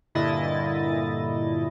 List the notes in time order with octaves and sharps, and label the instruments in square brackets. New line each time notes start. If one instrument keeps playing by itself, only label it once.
[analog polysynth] G2 A#2 D3 E4 D#5 A6